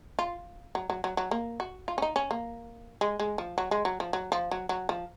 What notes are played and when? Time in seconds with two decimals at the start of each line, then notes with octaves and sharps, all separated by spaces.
0.19 F4
0.75 F#3
0.90 F#3
1.04 F#3
1.17 F#3
1.31 A#3
1.60 F#4
1.88 F4
1.98 C#4
2.02 D#4
2.16 C#4
2.31 A#3
3.01 G#3
3.20 G#3
3.38 F3
3.58 F#3
3.71 G#3
3.85 F#3
4.00 F3
4.13 F#3
4.32 F3
4.51 F#3
4.69 F#3
4.89 F3